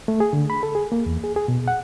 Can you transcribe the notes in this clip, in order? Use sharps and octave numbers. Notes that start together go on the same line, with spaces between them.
A3
G#4
D3
B5
A4
G#4
A#3
E2
G#4
G#4
B2
F#5